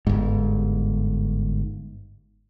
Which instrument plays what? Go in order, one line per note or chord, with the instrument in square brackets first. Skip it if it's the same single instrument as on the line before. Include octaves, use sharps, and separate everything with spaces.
[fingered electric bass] G1 G#2